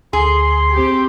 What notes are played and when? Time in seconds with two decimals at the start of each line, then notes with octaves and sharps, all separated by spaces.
0.13 D2 G#4 C6
0.73 C4 G4